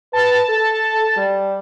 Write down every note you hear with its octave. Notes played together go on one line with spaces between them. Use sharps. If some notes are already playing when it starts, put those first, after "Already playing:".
B4 A5
A4
G3